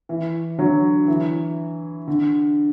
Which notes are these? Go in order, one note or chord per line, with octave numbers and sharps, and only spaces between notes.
E3
D3 F#3
E3
D3